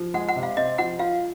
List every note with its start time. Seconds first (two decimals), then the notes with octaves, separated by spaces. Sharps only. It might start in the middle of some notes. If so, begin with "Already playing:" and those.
Already playing: F3
0.14 G#3 F#5
0.28 F#5
0.36 C3
0.43 F5
0.57 C4 D#5
0.78 F3 F#5
0.99 F4 F5